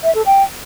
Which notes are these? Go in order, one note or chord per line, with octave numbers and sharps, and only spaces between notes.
E5
A4
G5